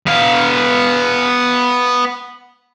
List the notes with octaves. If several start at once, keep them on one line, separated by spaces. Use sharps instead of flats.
B3 F5